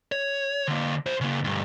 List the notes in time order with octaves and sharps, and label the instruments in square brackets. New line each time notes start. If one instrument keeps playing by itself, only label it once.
[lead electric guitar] C#5
D3 A#3
E4 C5
C#3 A#3
D2 G2